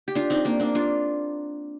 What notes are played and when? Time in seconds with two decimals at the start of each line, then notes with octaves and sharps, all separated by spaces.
0.08 G4
0.15 D4 F4
0.30 C4 D#4
0.45 A#3 D4
0.60 A#3 D4
0.75 D4 F4